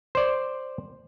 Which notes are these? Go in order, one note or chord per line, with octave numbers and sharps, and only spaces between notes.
C5 D5